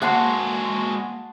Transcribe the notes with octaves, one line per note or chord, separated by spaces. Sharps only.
G#3 A#3 F#4 F#5 A5 C6